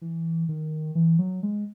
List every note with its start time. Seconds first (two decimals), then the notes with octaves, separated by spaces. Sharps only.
0.02 E3
0.49 D#3
0.95 E3
1.19 F#3
1.43 G#3